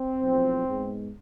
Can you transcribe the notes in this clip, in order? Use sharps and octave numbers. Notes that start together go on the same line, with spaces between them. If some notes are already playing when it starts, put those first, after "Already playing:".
Already playing: C4
B1 A2 F3
G#2 G#3 B3